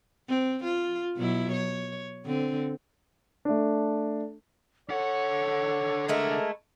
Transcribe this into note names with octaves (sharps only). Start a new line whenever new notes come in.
C4
F4
B2 F#3 E4
C#5
D3 C4
A3 D4
D3 A4 C#5 F#5
G#3 A3 E4 A#4